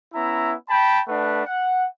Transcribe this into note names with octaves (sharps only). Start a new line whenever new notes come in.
B3 C#4 E4 E5 A#5
G5 A5 B5
A3 D4 B4 F#5
F#5